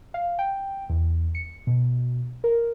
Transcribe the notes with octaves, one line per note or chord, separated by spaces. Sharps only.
F5
G5
E2
C#7
B2
A#4